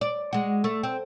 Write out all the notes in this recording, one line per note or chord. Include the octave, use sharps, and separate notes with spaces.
D5
G#3 F#4
A3
C4